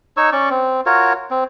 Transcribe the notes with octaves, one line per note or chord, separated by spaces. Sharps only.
D#4 C#5 C#6 E6
C#4 D5 C#6
C4
F4 F#4 A#4 C#5
C4